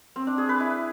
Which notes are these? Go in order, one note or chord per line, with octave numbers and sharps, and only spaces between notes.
C4
D4
G#4
B4
E4